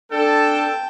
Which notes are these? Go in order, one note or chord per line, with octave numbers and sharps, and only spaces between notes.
D4 A4 G5 A5